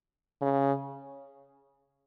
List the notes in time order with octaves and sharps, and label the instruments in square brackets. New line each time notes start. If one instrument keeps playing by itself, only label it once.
[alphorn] C#3